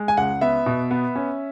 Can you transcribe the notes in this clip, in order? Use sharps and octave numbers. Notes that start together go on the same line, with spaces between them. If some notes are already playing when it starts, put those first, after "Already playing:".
Already playing: G#3
G#5
C#2 F#5
B3 E5
B2
B3
C#4